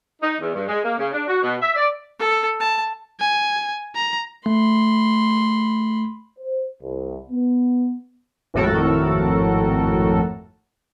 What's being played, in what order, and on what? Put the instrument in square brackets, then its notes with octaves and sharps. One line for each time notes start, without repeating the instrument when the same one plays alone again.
[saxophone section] D#4
E2
G2
G#3
A#3
C#3
D4
F#4
B2
E5
D5
[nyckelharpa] A4
A5
[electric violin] G#5
A#5
[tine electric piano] A3 [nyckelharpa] B5 C6
[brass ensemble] C5
C2
B3
[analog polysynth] G#1 F2 A2 F#4 A4 A#4